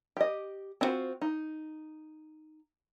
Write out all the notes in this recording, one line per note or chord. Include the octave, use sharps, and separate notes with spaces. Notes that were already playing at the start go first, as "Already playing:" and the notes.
G4 D#5
C4 D4 F4 F#4 C5
D#4